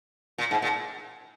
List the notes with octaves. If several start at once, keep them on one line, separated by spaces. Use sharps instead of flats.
A#2
G#2
A#2